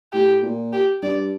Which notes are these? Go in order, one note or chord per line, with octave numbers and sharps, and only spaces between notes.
A2 G4
A#2
G4
G2 D5